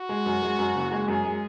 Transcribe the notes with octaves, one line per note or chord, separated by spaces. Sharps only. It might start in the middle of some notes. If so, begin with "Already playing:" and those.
Already playing: F#4
G#3
F#2
G#3
F#2
F#1
G#3
F#2 G#4
G#3